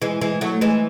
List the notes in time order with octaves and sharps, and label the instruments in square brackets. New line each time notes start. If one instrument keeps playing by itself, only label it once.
[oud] E3 G#3
E3 G#3
F#3 A3
E3 G#3